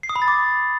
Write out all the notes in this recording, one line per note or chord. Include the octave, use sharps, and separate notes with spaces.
C7
D#6
B5
A6
D6